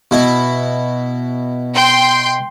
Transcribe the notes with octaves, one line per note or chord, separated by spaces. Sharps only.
B2 E4
G5 C6 G6